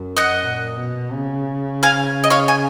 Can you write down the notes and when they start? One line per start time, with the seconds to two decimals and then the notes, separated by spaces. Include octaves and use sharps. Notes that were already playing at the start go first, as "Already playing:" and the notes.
Already playing: F#2
0.17 D#5 F#5
0.41 A#2
0.76 B2
1.12 C#3
1.83 F5 G#5
2.24 D#5
2.30 C#5 F5
2.48 G#5